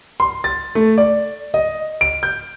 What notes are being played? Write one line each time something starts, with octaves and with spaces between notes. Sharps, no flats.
C6
A6
A3
D5
D#5
D7
G6